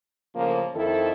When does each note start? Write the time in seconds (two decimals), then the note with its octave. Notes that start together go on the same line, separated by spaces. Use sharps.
0.35 A2 C#3 F3 A#3
0.75 F2 D#3 E4 A4